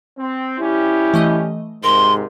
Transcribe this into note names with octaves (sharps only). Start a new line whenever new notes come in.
C4
G3 C#4 E4 G4
E3 A3 D#5
G#1 G#2 C3 A#4 C6